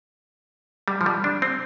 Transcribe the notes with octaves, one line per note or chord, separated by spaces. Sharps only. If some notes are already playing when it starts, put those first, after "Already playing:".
G3
F3
G3
D4
C4